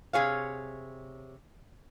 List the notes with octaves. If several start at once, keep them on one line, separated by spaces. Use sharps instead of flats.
C3 G#4 C#5 F5